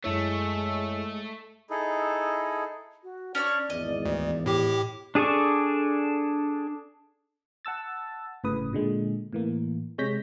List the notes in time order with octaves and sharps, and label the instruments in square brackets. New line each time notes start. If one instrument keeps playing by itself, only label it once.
[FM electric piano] F#2 E4 C#5 [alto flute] G#3 [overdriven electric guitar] A3 [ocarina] E6
[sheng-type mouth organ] D#4 E4 G#4 A4
[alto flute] F#4
[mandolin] C#4 D4 C#5 [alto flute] D5
[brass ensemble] G#1 E2 [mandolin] D#5
[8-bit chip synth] D2
[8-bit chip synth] A2 G4 D6 [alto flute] G5
[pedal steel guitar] D4 G#4 A4 D5 C#6
[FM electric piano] F#5 A5 E6 A6
G1 A2 C#3 B4 D#6
A#2 D3 G#3
A2 E3 A#3
C3 G#3 C#5 G6 A#6 B6